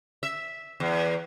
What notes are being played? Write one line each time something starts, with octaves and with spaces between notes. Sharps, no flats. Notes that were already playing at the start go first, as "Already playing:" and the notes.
E5
E2